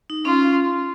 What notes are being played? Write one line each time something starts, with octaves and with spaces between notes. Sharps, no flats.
D#4
C#4 F4